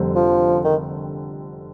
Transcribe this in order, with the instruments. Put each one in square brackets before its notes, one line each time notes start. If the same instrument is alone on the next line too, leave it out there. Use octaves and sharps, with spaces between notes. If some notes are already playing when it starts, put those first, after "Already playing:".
Already playing: [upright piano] F1 F2 D3 G3 C4
[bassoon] F3
D#3